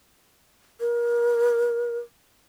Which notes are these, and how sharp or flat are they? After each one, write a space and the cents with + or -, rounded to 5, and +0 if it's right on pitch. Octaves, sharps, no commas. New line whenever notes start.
A#4 +30